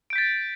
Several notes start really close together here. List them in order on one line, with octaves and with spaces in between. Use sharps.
D7 G6 B6 A6